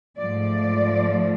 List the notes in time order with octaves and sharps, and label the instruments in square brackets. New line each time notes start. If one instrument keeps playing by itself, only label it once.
[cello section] G#2 F3 A3 D5